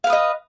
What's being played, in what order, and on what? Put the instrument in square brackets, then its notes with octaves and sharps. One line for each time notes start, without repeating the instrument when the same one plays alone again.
[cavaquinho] F5
B4
D#6
D#5